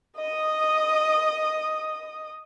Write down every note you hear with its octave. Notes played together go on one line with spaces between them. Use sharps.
D#5 D#6